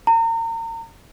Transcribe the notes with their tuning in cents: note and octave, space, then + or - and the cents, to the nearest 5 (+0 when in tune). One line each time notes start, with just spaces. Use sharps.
A#5 -35